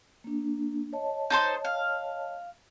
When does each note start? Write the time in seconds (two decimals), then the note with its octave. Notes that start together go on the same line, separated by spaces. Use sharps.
0.24 A#3 D4
0.93 C#5 D#5 A5
1.30 D#4 A4 C5
1.65 F5